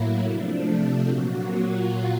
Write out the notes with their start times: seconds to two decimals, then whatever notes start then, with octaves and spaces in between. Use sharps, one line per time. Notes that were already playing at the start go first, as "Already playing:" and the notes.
Already playing: A2 F#3 A#3 E4
0.26 C3 F3 A3 D4
0.68 C4
1.08 A#2 F#3 A#3 F#4
1.50 F4